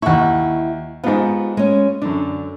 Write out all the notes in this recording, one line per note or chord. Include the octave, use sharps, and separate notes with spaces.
D#2 E4 F#5 C#6
G#2 B3 F4 G4
G#3 C#4
F#2 D3 D4